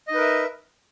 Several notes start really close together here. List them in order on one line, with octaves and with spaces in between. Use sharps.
D#5 D#4 B4 A#4 E5